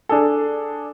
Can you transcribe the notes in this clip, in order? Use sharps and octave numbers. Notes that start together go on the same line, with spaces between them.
D4 G#4 A4